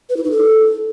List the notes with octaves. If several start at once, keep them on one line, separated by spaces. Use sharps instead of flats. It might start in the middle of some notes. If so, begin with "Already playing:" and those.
B4
E4
D#4
A4